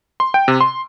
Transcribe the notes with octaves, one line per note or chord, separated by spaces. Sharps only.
C6
G5
C3
C6